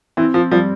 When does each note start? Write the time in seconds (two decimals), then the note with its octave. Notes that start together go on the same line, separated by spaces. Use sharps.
0.17 E3 C4
0.34 F3
0.51 F3 G3